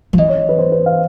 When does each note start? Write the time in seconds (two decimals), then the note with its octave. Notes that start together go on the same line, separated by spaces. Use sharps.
0.13 F3
0.18 E3 D#5
0.29 C#5
0.49 B4
0.59 C5
0.72 B4
0.86 F5